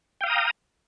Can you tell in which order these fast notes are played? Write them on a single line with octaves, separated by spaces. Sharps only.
G5 F5 D#6 A#5